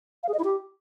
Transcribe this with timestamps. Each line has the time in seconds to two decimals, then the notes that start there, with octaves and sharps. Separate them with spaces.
0.23 F5
0.28 G#4
0.34 D#5
0.39 E4
0.44 G4